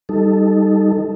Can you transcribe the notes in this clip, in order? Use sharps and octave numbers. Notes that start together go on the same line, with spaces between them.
G3 D#4 A4